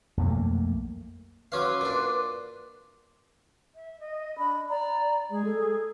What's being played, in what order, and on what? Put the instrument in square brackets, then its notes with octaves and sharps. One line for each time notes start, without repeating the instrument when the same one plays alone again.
[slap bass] B1 F2 A3 A#3
[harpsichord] F#3 C#4 F5 [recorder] B4 [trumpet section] C6 D6
[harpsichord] A#2 D4
[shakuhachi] E5
D#5
[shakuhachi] D4 [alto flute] B5
[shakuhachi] D5 [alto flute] A#5
[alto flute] G#3 [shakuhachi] G#4
[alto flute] A4